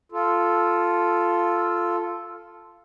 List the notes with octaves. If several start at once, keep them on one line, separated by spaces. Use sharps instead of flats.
F4 A4